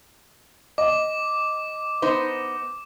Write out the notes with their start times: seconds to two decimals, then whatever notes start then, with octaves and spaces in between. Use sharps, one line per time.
0.78 D#5 D6
2.02 B3 D#4 C5